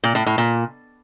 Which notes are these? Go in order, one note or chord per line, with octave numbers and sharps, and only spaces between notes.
A#2
A2
A2
A#2